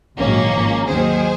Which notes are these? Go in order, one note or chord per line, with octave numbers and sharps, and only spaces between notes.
A#1 G#2 D#3 F#3 A#3 C#4
G#1 G#2 F3
D#2 D#3 F#3 G#4 C5